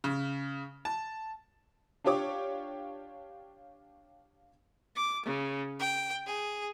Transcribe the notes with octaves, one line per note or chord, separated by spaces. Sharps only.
C#3
A5
D4 F4 G4 C#5 D6
D6
C#3
G5
G#4